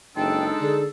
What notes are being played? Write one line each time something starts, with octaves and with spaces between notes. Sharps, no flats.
F#1 G#3 D4 D#4 A4 G5
D3 G#4